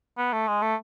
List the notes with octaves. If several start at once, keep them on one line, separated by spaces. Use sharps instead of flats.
B3
A3
G#3
A3